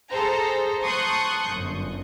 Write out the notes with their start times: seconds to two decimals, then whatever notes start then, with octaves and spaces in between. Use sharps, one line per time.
0.13 G#4 A4 C5 A#5
0.83 A5 C6 C#6 D#6 F#6 G6
1.55 G1 F#2